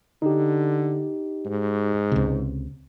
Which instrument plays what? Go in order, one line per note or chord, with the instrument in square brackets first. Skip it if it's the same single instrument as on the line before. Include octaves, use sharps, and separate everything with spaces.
[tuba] D3 [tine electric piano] D#4 G4
[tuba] G#2
[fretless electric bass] C#2 C3